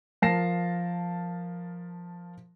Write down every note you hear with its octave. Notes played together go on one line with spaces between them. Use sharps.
F3 A#4 A5 A#6 C7 E7